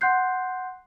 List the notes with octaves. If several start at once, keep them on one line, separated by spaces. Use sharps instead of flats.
F#5 C6 F#6 G6 C7